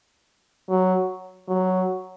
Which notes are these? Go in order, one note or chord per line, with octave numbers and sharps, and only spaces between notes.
F#3
F#3